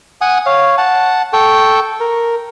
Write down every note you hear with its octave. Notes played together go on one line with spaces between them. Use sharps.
F#5 G#5 D#6
C#5 F5
F#5 A5
A4 G5 C#6
A#4